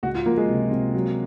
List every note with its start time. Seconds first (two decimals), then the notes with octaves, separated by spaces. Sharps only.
0.03 C#2 F#4
0.15 F4
0.26 F3 A#3
0.37 G#3
0.49 C3
0.71 C3
0.94 F#3